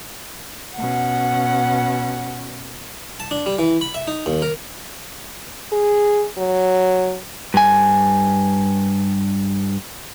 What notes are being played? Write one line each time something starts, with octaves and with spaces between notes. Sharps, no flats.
B2 C#4 F#5
A5
D4
G3
E3
B5
E5
D#4
D#2
A#4
G#4
F#3
G2 G#5